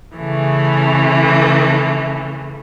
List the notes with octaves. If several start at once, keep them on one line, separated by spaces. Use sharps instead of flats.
C#3 E3 A3